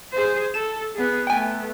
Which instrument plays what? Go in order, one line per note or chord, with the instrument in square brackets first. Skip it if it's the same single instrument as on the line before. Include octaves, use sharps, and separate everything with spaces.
[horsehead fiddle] G#4 C5
[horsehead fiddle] A4 [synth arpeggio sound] E7
[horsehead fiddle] B3 G#4
[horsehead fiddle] A3 B3 [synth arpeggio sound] G5 G#5